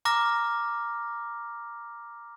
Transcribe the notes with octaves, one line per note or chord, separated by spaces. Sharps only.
A#5 D6 F6 A#6